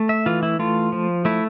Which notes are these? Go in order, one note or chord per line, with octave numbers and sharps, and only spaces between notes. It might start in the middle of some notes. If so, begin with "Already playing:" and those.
Already playing: A3
E5
E3 F4
E4
A3 F4
F3
A3 E4